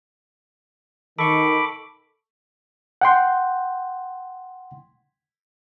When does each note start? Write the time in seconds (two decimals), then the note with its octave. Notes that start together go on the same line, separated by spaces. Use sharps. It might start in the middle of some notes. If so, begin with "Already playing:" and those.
1.19 D#3 A4 B5 C#6 D6
3.01 F#5 G5 C6